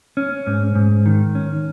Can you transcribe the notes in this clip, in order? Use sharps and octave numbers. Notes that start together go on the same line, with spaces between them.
C#4
G#2
G#2
D#3
C#4